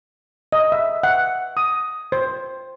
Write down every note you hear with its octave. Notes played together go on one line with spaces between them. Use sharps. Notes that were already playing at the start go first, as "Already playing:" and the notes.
D#5
E5
F#5
D#6
C5